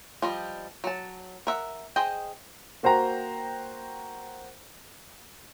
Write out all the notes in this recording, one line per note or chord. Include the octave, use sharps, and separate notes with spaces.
F3 G3 D#5
F#3 A5
A#4 E5 F#5
G#4 C5 D#5 G5
A#3 F#4 C5 G5 A#5